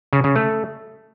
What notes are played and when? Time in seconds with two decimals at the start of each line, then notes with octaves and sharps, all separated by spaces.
0.13 C#3
0.24 C#3
0.36 A3